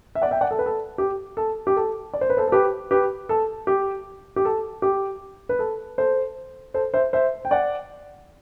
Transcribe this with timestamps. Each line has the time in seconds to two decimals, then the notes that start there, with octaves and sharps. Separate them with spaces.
0.15 E5
0.22 D5 F#5
0.31 E5 G5
0.41 D5 F#5
0.51 A4
0.59 B4
0.66 A4
0.98 G4
1.37 A4
1.67 G4
1.76 A4
2.14 D5
2.21 C5
2.30 B4
2.37 A4 C5
2.48 A4
2.52 G4 B4
2.91 G4 B4
3.29 A4
3.67 G4
4.36 G4
4.45 A4
4.82 G4
5.49 B4
5.59 A4
5.98 A4 C5
6.74 A4 C5
6.94 C5 E5
7.13 C5 E5
7.45 G5
7.51 D5 F#5